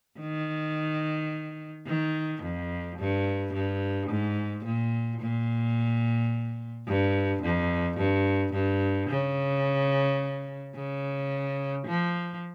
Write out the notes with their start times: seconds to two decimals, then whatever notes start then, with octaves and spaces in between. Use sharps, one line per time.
0.20 D#3
1.86 D#3
2.42 F2
2.98 G2
3.53 G2
4.09 G#2
4.64 A#2
5.21 A#2
6.87 G2
7.42 F2
7.97 G2
8.53 G2
9.09 C#3
10.75 C#3
11.86 F3